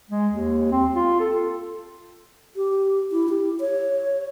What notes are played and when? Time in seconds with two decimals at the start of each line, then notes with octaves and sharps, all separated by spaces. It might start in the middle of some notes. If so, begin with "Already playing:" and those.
0.10 G#3
0.32 D#2
0.71 C4
0.95 F4
1.20 A4
2.56 G4
3.12 E4
3.29 G4
3.60 C#5